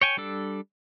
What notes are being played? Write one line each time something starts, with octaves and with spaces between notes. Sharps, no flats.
C#5 G5 G#5
G3 D4 A4